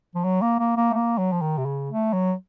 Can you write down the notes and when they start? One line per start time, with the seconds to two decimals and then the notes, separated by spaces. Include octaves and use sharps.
0.15 F3
0.24 F#3
0.41 A#3
0.59 A#3
0.77 A#3
0.91 A3
0.94 A#3
1.18 F#3
1.32 F3
1.41 D#3
1.58 C3
1.66 C#3
1.89 A3
2.13 F#3